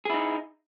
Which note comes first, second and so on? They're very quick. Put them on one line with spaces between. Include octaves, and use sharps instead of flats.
G#4 E4 D#4